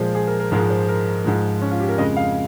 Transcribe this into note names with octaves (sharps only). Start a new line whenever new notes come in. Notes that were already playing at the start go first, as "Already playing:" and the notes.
Already playing: A#2 F3 G#3 C5
G#4
A#4
A#4
G#2 F3 G#3 A#4
C5
A#4
G#2 F3 G#3
C#4
F4
G4
A#4
F2 C#3 G#3 D#5
F5